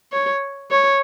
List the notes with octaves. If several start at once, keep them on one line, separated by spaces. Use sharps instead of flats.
C#5
C#5